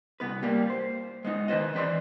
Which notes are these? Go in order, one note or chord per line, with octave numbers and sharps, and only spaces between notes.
C2 B3 B4
G3 A#3 G4
C5
G#3 B3 D#4
D#3 B4 C5 D#5
E3 C4 B4 D5 C6